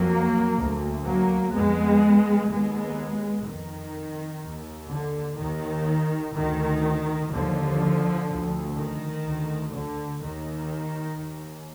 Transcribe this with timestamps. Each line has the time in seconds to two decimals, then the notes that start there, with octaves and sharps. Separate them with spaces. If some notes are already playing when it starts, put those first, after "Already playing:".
Already playing: F2 F#3 A#3
0.55 D2
1.04 F#3 A#3
1.52 F2 G#3 B3
2.48 D#2 G#3 B3
3.46 F2 D#3
4.42 D#2
4.90 D3
5.38 D#2 D#3
6.35 D2 D#3
7.32 D#2 D3 F3
8.29 D2
8.77 D#3
9.26 D2
9.73 D3
10.22 D#2 D#3
11.18 D#2